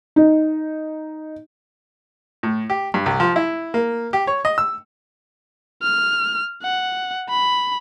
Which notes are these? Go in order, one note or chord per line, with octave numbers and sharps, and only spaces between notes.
D#4
A2
G4
G2
C2
F3
E4
A#3
G4
C#5
D#5
E6
F6
F#5
B5